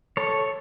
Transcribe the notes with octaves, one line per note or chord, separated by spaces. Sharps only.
A4 C#5